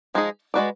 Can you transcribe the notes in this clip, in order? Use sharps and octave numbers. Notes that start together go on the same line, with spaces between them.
F3 G#3 D#4 G#4
G#3 D#4 F#4 B4 D5